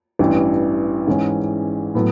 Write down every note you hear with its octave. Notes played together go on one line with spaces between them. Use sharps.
A1 G2 E3
G#2 E3 G#3 C#4
A2 F#3 B3